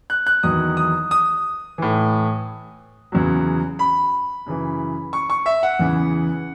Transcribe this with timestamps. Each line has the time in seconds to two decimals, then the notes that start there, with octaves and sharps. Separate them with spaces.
0.10 F#6
0.26 F#6
0.43 E2 D#3 F#3 D#6
0.77 D#6
1.11 D#6
1.78 A2 E3
3.12 E2 C#3 F#3
3.79 B5
4.46 F#2 C#3 E3
5.13 C#6
5.30 C#6
5.46 E5
5.63 F#5
5.79 E2 C#3 E3